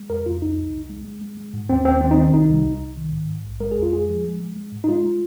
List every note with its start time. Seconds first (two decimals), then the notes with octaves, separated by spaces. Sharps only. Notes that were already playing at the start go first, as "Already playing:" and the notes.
Already playing: G#3
0.09 F2 A#4
0.26 F2 F4
0.42 C2 D#4
0.58 C2
0.73 C2
0.90 G#3
1.05 G#3
1.21 G#3
1.38 G#3
1.53 G#2
1.69 D#2 C4
1.85 D#2 C4
2.01 D#3 C4
2.11 D#4
2.17 D#3 C4
2.33 C2 D#4
2.49 C2
2.65 C2
2.81 C2
2.97 D#3
3.13 G#2
3.29 G#2
3.44 A#1
3.60 G#3 A#4
3.72 G#4
3.77 F2
3.83 F4
3.93 G#3 G#4
4.09 F3
4.25 G#3
4.41 G#3
4.57 G#3
4.72 G#2
4.84 D#4
4.88 G#3 F4
5.04 G#3